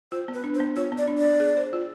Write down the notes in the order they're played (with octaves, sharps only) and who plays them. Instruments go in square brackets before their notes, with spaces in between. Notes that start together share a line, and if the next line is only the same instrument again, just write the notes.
[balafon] F4 [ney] C5
[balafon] B3
[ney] B4
[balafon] D4
[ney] C5
[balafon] B3
[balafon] F4 [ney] C#5
[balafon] B3
[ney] D5
[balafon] D4
[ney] D5
[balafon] B3
G#4
C5
F4